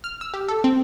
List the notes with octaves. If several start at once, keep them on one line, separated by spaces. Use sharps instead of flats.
F6
E6
G4
A4
C4